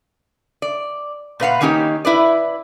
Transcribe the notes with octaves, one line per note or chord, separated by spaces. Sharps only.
D5
A#2 B4 F5 F#5
D#3 A#3 C#4 D#4 G4
E4 B4 D5